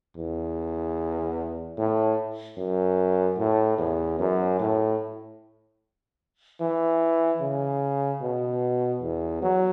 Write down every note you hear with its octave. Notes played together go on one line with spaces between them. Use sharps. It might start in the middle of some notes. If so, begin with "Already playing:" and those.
E2
A2
F#2
A2
E2
F#2
A2
E3
C#3
B2
E2
F#3